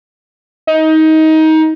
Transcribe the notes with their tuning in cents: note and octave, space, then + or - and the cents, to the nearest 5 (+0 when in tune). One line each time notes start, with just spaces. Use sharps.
D#4 +20